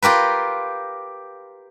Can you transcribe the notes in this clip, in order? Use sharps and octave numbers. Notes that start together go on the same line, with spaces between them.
F4 G4 A#4 B4